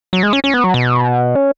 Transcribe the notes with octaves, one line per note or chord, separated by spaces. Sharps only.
F#3
G#3
C#4
C#4
B3
F#3
B2
C#4